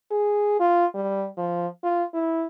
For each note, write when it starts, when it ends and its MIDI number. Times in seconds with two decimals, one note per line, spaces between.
0.11 0.59 68
0.60 0.86 65
0.95 1.27 55
1.38 1.67 53
1.83 2.04 65
2.14 2.47 64